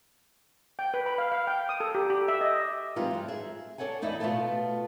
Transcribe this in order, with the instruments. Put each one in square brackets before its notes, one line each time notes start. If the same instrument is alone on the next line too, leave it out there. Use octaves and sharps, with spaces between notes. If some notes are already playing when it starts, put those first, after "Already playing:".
[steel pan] G5
B4
B5
F5
F5
G5
D#6
A4
G4
G4
E5
D#5
[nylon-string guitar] E3 G3 G#3 C4 D#4 F4
G2 F#3
G#4 E5
D4 A4 C#5 F#5 G#5
E2 D#4 E4 D5 E5
B2 A3 B3 C#4 F4 A4